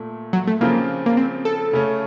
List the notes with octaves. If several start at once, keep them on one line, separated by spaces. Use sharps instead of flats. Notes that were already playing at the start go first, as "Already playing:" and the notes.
Already playing: A#2 A3
F#3
A3
C#3 F3 A#3 C4 F4
A#3
C4
A4
C#3 A3 C#4